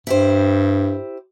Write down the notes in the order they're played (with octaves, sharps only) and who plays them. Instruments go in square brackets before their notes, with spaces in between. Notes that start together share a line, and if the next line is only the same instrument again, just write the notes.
[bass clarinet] G2 [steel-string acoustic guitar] E4 G4 C5